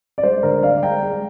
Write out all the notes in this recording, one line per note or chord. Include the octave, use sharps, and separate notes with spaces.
D5
G#3 C5
D2 A#4 D5
G#3 D5 F5
G#3 G5 A#5
G#3